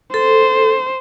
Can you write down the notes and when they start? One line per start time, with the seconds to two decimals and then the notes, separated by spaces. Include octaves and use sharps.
0.14 A4 C5